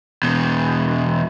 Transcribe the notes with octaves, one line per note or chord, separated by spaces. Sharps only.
E2 B2